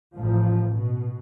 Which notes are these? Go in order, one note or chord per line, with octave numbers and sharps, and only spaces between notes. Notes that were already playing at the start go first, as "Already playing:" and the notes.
A1 F3
B2